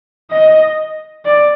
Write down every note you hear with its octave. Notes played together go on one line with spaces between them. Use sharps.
D#5
D5